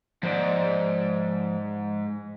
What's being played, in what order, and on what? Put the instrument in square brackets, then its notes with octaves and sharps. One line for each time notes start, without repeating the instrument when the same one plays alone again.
[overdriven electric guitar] G#2 [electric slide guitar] F3 C5 D5